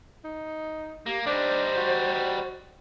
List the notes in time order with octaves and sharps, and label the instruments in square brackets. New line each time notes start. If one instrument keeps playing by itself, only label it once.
[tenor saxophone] D#4
[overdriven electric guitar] A#3 [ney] G4
[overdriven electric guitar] G3 D#4 [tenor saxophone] D4 [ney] C5
[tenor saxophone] F#4